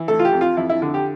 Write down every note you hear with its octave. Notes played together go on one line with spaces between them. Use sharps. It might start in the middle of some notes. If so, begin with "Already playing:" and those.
Already playing: E3
A3 A4
F4
G4
F2
F4
F2 E4
E4
D3
G4